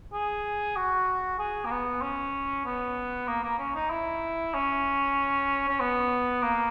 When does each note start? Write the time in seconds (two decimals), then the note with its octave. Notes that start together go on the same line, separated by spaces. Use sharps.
0.13 G#4
0.76 F#4
1.39 G#4
1.65 A#3
1.71 B3
2.01 C#4
2.65 B3
3.27 A#3
3.43 A#3
3.58 C#4
3.75 D#4
3.90 E4
4.54 C#4
5.68 C#4
5.80 B3
6.42 A#3